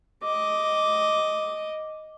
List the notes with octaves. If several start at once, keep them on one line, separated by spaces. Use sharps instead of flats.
D#5 D6